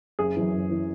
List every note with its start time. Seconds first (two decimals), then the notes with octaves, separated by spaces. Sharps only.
0.19 F#1 G#4
0.36 F#2 E3
0.53 F#1
0.71 E3